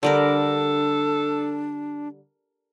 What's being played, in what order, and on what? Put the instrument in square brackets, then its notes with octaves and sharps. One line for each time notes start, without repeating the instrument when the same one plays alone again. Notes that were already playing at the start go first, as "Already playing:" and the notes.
[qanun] D3 G3 A#4 [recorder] D4 [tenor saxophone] A4